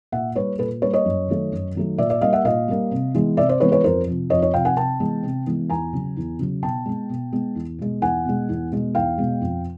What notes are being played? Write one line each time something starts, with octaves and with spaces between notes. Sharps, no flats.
A#2 E5 F#5
G3 A#3 B4 C#5
A#2 A4 B4
G3 A#3 B4 C#5
C#5 D#5
F#2
D#3 F#3 A3
F#2
D#3 F#3 A3
A#2 D5 E5
D5 E5
G3 A#3 D#5 F5
E5 F#5
A#2 D#5 F5
G3 A#3
C3
E3 G#3 B3
C3 D5 E5
C5 D5
E3 G#3 B3 B4 C#5
B4 C#5
F2 A#4 C5
C3 F3
F2 C#5 D#5
C#5 D#5
C3 F3 F5 G5
F#5 G#5
C3 G5 A5
E3 G#3 B3
C3
E3 G#3 B3
E2 G#5 A#5
C#3 F#3
E2
C#3 F#3
B2 G5 A5
G#3 B3
B2
G#3 B3
E2
B2 G#3
E2 F#5 G#5
B2 G#3
E2
B2 G#3
E2 F5 G5
B2 G#3
F2